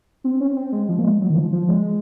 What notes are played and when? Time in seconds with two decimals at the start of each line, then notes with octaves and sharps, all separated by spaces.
0.24 C4
0.40 C#4
0.56 C4
0.72 G#3
0.89 F3
0.99 A#3
1.05 G#3
1.21 F#3
1.30 D#3
1.36 F3
1.52 F3
1.69 G#3